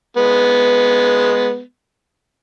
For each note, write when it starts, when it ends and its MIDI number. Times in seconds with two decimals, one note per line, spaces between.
0.17 1.60 56
0.17 1.60 59